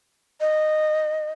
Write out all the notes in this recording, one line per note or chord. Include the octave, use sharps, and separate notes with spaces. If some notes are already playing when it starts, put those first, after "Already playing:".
D#5